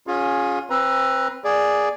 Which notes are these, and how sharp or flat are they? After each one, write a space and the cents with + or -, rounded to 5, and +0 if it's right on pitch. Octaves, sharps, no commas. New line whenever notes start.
C#4 +0 F4 +30 G#4 +0
C4 +25 B4 +0 A#5 +30
A#3 +0 G#4 +0 D5 +0